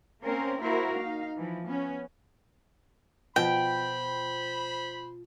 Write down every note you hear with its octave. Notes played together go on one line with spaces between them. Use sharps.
A#3 C4 C#4 A#4 C5
A#3 E4 F#4 A#4 C5
D#4 F5
E3 F3
B3 C#4
B2 F3 C5 G5 B5